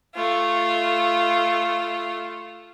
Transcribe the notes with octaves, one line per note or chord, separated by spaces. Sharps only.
A3 F4